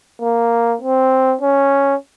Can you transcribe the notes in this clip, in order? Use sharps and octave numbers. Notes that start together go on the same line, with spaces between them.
A#3
C4
C#4